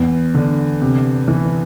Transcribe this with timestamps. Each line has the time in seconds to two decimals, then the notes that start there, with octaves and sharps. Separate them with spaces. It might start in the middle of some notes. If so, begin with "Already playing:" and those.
Already playing: E2
0.34 D3
0.81 C3
1.28 E3